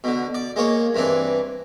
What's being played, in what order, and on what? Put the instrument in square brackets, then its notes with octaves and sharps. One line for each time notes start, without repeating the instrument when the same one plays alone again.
[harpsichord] B2 D3
D5
G#3 A#3 C#5
G2 E3 C4 D4